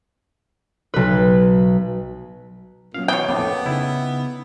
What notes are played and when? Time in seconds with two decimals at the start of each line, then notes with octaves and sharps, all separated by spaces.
0.94 B1 B4
2.94 A#2 F#3 B3 C#4 F5
3.08 B2 E3 C#5 G5 D#6
3.29 A#1 F2 A2 B3 D6
3.66 C#3 D#4 E4